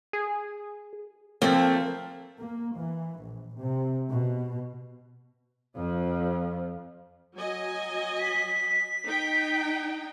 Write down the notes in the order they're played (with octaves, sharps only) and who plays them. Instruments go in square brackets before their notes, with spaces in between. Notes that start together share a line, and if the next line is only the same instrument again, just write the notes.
[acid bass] G#4
[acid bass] F3 [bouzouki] A3 A#3 [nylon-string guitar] C4
[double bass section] A#3
E3
A#1
C3
B2
[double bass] F2 F3
[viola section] F#3 D#5 G#5
[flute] B6
[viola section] D#4 G5